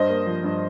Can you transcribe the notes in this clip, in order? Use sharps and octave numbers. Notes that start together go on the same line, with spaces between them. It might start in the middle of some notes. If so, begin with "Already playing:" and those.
Already playing: G2 C5 D#5
A#3
F3
G2